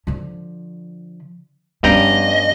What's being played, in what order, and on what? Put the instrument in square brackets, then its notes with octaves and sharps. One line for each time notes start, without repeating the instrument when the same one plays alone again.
[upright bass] D3 F3
[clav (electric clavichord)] G2 G5 A#5 [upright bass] F3 G3 [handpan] B3 C#4 [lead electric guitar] D#5